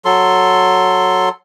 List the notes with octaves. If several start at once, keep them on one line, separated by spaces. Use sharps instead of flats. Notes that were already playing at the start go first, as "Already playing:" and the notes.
F#3 A4 C6